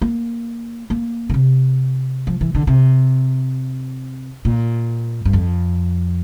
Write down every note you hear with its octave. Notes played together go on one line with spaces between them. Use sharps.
A#3
A#3
D3
C3
F3
E3
D3
C3
A#2
G2
F2